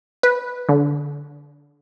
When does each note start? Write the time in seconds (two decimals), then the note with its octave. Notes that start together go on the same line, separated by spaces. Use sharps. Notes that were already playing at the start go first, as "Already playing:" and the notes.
0.23 B4
0.69 D3